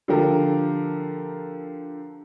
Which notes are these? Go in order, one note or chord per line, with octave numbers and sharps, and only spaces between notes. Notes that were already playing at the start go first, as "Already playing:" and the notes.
D3 F3 G4 A4 A#4